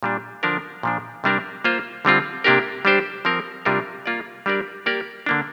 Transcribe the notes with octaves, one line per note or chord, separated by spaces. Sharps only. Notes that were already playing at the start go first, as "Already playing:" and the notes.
A#2 G3 D4
D3 F3 D4 A#4
A#2 F3 D4
C3 G3 D4 A#4
A#3 F4 C5
D3 G3 C4 F4
C3 A#3 D4 G4 A#4
G3 D4 G4 C5
F3 C4 A#4
C3 G3 D4 F4 A#4
A#3 F4 D5
G3 D4 G4 A#4 D5
A#3 G4 A#4 D5
D3 A#3 D4